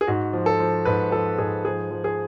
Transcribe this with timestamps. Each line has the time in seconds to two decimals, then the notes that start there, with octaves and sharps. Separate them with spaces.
0.01 G#4
0.07 G#2 F#4
0.33 F3
0.46 A4
0.60 F3
0.85 G#2 B4
1.12 F3 A4
1.38 G#2 G#4
1.65 F3 G#4
1.91 F3
2.04 G#4